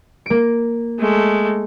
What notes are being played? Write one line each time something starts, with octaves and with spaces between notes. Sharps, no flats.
A#3 D7
G#3 A3